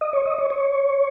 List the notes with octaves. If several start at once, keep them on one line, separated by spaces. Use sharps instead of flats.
D#5
C#5
D#5
C#5
C#5